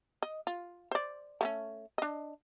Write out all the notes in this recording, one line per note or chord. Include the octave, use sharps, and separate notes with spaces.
D#5
F4
C5 D5
A3 B3 C#4
D4 D#5